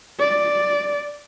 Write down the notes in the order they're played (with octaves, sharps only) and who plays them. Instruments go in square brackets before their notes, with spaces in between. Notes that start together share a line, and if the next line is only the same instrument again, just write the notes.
[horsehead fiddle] D5